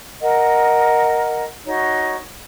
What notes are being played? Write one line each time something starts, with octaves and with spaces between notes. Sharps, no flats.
A#4 D#5 F#5
D#4 F#4 C#5